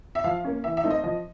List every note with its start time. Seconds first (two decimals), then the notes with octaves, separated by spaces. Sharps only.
0.15 E5
0.24 F3 F5
0.44 A#3 C#4
0.64 E3 E5
0.77 E5
0.84 A3 C4 D#4
0.91 D#5
1.04 F3 D#5